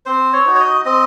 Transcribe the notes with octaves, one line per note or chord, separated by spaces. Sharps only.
C4 C5
C#5
D#4 F#4
C#5
D#5
C4 D#5